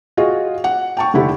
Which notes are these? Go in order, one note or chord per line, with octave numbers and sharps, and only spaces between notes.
F4 F#4 G#4 D#5
F#5
G5 A5 C#6
F1 D3 E4 G4